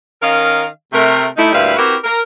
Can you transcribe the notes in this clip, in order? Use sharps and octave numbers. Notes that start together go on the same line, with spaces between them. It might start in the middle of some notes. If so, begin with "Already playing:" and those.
D#3 C#4 A#4 D#5 F5
C3 A3 A#4
A3 D#4 E4
D2 A#2 G3 E4 B4 F5
C4 E4 F#4 G4 A#4 B4
A#4